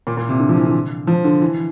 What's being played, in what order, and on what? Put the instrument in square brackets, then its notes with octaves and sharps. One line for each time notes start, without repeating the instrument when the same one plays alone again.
[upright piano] A#2
A#2
C3
D3
F3
E3
D3
F3
D3
E3